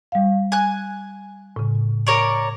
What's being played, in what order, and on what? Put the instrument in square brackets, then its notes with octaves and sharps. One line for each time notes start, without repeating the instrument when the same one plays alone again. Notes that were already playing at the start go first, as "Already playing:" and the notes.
[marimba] G3 F5
[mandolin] G#5 F#6
[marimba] A2 C#3
[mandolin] A#4 C#5 D5